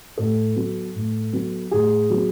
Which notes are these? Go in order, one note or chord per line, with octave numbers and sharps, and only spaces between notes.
A2 A4
F#3 B3
A2
F#3 B3
A2 G#4
F#3 B3